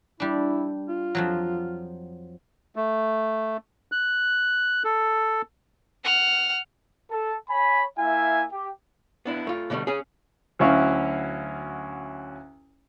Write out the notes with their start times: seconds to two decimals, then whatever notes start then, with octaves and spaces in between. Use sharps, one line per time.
0.20 G3 D4 E4
0.88 F4
1.15 F2 F3 F#3
2.76 A3
3.92 F#6
4.84 A4
6.04 F#5 F6
7.11 A4
7.50 C#5 G#5 B5
7.99 A#3 E4 E5 F5 G#5
8.52 G4
9.25 B3 D4 E4
9.47 A3 F4
9.70 B2 D3 F#3 G3 A3
9.87 C#4 G#4
10.59 D2 F#3 C#4 E4 F#4 F5